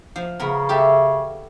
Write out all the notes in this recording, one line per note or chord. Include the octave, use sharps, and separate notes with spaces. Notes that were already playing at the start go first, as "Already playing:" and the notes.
F3
C#3 B3 A#4
G4 A4 E5